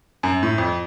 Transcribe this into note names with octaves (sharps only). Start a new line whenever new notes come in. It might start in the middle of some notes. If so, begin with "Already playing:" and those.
F#2
A2
F2